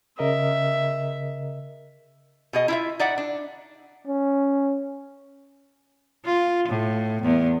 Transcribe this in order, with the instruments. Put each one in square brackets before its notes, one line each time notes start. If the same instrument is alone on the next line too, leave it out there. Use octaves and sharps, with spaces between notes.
[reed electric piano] C#3 A#4 D#5 [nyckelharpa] E5
[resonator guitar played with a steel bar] B2 G#4 D#5
E4 F4 E5
D#4 D5 E5 F#5
D4
[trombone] C#4
[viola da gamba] F4
A2
E2